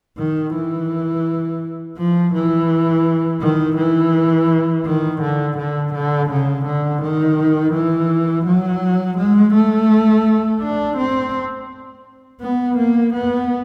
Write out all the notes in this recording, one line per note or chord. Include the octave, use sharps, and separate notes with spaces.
D#3
E3
F3
E3
D#3
E3
D#3
D3
D3
D3
C#3
D3
D#3
E3
F#3
G#3
A3
D4
C4
B3
A#3
B3